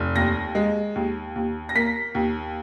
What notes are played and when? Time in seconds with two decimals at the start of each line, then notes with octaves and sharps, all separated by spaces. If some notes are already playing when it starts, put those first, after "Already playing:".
Already playing: F1
0.16 D#2 A#6
0.55 G#3
0.95 D#2
1.36 D#2
1.69 A#6
1.75 A#3 B6
2.15 D#2